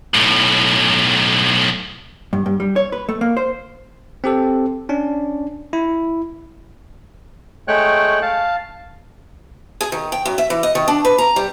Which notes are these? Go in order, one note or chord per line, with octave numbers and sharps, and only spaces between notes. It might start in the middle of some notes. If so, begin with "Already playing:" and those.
B1 A2
G2
G2
G3
C#5
B4
A3
A#3
C5
C4 G4 A4
C#4 D4
E4
G#3 A3 C#5 G5 C#6 F#6
F5 A5
G#4
D#3
G5
F#2
E5
E3
D#5
D#3
D4
B4
A#5
G3